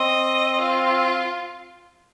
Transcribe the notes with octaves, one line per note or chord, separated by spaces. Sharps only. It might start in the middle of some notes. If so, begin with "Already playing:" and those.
Already playing: C4 D#5
F4